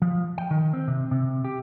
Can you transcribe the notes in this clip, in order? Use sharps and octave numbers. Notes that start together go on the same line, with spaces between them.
F3
G5
D#3
C4
C3
C3
G4